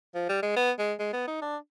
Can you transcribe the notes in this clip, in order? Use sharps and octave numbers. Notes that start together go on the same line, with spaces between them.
F3
G3
G#3
B3
G#3
G#3
B3
D#4
D4